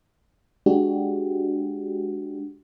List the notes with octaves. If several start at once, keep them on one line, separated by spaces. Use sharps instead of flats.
G#3 D4 F#4 G4